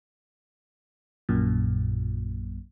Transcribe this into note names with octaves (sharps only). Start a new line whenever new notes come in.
A#1 F#2 A#2